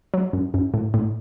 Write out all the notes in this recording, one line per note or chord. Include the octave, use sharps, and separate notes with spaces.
F#3
F#2
F#2
A2
A2